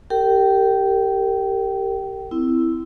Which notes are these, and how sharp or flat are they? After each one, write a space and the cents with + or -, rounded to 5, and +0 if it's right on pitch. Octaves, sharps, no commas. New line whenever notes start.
G4 +0 A#4 -35 G5 -20
C4 -25 E4 +0